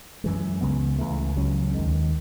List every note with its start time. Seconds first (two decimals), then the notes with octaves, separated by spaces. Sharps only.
0.24 F#2 E3 G#3
0.61 C#2 C#3 G#3 B3
0.99 C#2 C#3 E3 A3
1.36 C#2 C#3 F#3 C#4
1.75 D#2 D#3 G#3